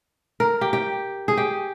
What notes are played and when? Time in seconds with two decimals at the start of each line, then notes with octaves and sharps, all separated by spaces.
0.40 A#4
0.61 G4
0.73 G4
1.28 G#4
1.37 G4